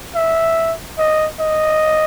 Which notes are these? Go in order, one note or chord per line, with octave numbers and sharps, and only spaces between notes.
E5
D#5
D#5